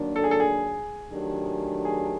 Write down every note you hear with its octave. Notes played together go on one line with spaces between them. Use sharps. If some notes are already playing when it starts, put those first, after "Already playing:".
Already playing: D#3 F#3 A#3 D4
A4
G#4
A4
G#4
D#3 F#3 A3 D4 G4
G#4